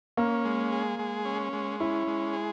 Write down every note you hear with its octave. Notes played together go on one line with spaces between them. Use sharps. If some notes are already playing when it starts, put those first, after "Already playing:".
A#3 C#4
G#3
G#4
G#3
C#4
G#3
C#4 E4
G#3
G#4